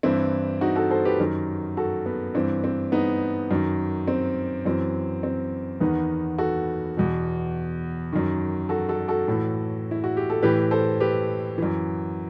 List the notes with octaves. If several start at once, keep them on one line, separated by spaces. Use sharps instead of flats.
G2 E3 C4 E4
D#4 F#4
F#4 A4
A4 C5
G4 B4
F#2 D#3
F#4 A4
B3
G2 E3 C4
C4
B3 D#4
F#2 D#3
C4
F#2 E3 C4
C4
E2 D#3 B3 D#4
F#4 A4
E2 B2
F#2 D#3
F#4 A4
F#4 A4
F#4 A4
A2 E3
E4
F#4
G4
A4
A2 E3 G4 B4
A4 C5
G4 B4
F#2 E3